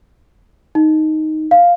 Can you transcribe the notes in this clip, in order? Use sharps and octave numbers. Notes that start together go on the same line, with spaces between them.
D#4
F5